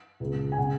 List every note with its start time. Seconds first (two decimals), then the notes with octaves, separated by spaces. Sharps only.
0.20 C#2 C#3
0.52 G#5
0.58 C#3 F#5